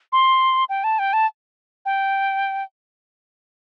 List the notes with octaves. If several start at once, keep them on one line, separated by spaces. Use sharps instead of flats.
C6
G5
A5
G5
A5
G5